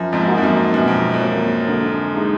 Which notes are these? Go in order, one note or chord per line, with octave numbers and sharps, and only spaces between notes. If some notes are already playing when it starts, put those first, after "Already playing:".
Already playing: F#2 F3
F2 G#2
A#3 D#4 F#4
F2
F#2
F#2 B2
F2
F2
F#3 A#3
D3
G#3 D#4